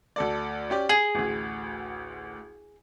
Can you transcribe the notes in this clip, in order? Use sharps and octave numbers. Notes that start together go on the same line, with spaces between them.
D2 A4 D5
C#4 G4 D5
G#4 F#7
A1 D2